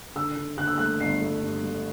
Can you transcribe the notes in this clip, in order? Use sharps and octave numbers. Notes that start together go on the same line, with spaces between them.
D3 E6
D3
D3 F#6
E6
A3 F#6
G1 C7
A3
G2
A3